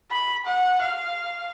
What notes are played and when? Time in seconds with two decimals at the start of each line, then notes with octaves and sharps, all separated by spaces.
0.11 B5
0.46 F#5
0.82 F5